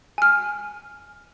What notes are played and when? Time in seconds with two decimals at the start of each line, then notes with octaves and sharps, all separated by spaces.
0.18 G#5 F6